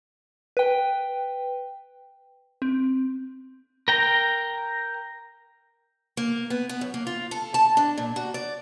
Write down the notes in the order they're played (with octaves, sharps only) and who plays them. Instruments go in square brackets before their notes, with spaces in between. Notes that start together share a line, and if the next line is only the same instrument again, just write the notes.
[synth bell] B4 G5
C4
[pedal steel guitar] A#4 G5 A#5
[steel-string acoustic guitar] A#3
B3
B3
F#2
A#3
F4
A4
A5
D4
A#2
F#4
D5